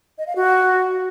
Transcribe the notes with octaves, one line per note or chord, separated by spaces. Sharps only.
D#5
F5
F#4